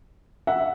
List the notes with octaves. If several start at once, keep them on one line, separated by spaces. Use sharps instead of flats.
E5 F#5